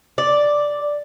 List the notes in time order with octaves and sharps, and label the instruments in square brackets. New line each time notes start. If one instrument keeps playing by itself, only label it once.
[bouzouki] D5